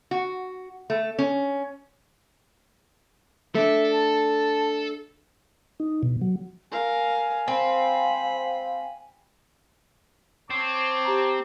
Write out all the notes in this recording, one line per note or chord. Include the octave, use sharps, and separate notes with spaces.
F#4
A3
C#4
A3 D4 A4 E5
A5
D#4
B2
F#3
A#4 F5 G#5
C4 F5 B5
C4 C#5 A5 D6
G4 A#5